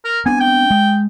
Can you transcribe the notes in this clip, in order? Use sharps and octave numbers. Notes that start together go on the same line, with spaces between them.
A#4
B3 C4 D4 G#5
G5
G#3